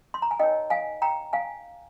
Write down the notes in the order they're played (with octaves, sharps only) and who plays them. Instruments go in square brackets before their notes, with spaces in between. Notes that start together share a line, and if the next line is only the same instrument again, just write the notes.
[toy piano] C6
A#5
G#5
D#4 A#4 C#5 D#5 G5
F5 G#5
G5 A#5
F5 G#5